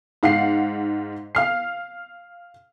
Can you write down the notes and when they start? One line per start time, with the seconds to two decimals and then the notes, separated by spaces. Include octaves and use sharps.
0.23 G#2 F5 F#5 C7
1.35 F5 F6 C7